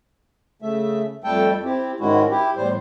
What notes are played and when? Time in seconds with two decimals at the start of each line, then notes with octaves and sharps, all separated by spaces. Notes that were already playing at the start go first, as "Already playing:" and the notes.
0.62 C#3 A3 E5
1.24 F2 G3 A3 A4 G5 A5
1.65 C4 E4 G4
2.00 G#2 D#3 G#3 C#4 E4 F#4
2.30 E4 G4
2.56 E2 A2 G3 C5